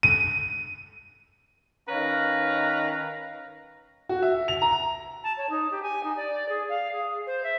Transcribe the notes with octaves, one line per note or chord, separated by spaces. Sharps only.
D#7
D#3 C#4 B4 F5 A#5
F#4
E5
F7
A#5
A5
C#5
D#4
G4
G#5
D#4
D5
G#4
F5
G#4
C5
E5